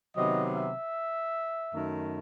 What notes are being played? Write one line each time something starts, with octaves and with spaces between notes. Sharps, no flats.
C3 D#3 F#3 B3 D#5
E5
F#2 D#3 A3